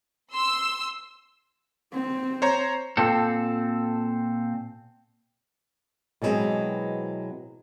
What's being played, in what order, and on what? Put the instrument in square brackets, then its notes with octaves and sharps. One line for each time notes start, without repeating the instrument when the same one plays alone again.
[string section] C6 E6
[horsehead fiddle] C4
[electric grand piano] C5 C#5 A#5
[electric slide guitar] A#2 C4 A4
[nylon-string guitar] B2 E3 F#3 G#3 B3 C4